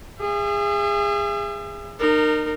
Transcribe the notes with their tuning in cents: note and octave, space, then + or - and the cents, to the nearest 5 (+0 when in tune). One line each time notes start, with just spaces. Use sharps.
G#4 -25 E5 +35
D#4 -35 A#4 -15